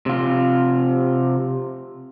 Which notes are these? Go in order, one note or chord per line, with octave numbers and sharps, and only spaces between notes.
C3 F4